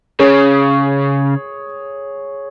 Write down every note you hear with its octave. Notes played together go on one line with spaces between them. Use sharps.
C#3 G#4 C#5